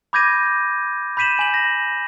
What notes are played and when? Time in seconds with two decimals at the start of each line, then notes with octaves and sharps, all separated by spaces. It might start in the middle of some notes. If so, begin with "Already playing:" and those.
0.13 B5 D6 G6 G#6 A#6 D#7
1.17 B5 G6 B6 D#7 E7 F#7
1.39 G#5 F#7
1.54 A#6